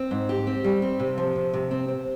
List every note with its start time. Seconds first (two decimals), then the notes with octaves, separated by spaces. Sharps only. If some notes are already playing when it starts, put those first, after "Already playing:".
Already playing: C4
0.11 G#2
0.29 G4
0.47 C4
0.64 G3
0.82 C4
1.00 C3
1.18 F3
1.36 C3
1.53 C3
1.71 C4
1.88 C4